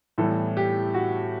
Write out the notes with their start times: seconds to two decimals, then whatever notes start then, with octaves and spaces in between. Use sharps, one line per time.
0.18 A2 E3 G3 B3 A4
0.57 G4
0.94 F#4